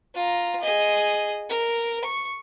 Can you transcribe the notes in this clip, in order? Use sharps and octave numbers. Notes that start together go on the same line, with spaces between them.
F4 A#5
G#4 D#5
A#4
C#6